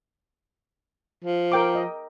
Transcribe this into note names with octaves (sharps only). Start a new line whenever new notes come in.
F3
A#4 G5 D6
D#5